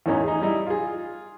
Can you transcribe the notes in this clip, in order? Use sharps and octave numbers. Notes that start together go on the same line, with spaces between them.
E2 A2 E3 C#4 D#4 E4
D#4 G#4
G3 D#4 E4
F4 G#4